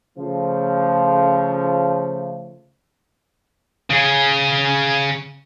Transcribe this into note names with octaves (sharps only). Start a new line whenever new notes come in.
C#3 F3 A3
C#3 G#4